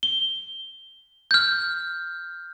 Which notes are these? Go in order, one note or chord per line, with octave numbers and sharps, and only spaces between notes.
G7
F6 G6